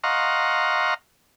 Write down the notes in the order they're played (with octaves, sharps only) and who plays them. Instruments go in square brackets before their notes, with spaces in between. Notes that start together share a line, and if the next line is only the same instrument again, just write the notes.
[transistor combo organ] D#5 F5 F#5 A#5 C6 C#6